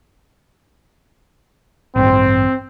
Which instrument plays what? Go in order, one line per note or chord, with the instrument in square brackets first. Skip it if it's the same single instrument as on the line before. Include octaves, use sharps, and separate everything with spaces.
[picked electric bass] A1 G2 [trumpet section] C4